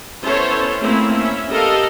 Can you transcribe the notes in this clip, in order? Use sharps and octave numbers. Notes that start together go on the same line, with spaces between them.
B3 C#4 E4 A4 C5 C#5
A3 A#3 C4 C#4 E4
C#4 E5
G4 A4 A#4 D#5 F5